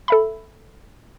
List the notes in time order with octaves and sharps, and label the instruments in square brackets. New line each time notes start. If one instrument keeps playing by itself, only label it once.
[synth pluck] A4 E5 B5